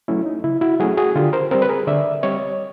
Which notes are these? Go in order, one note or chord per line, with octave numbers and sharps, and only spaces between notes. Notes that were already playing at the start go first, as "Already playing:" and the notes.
F#3 A3 C#4 E4
D#4
C#3 E4
E4 F#4
F#3 A3 C#4 F#4 G#4
F#4 G#4
D3 F4 G4
A#4 C5
G3 C4 A#4 C5
B4
G#4 A#4
D3 D5 E5
G3 C4 C#5 D#5